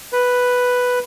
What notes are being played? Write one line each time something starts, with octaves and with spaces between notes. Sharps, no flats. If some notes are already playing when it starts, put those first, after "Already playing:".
B4